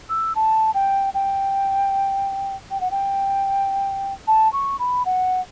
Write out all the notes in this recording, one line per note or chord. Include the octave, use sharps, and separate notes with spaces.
E6
A5
G5
G5
G5
F#5
G5
A5
C#6
B5
F#5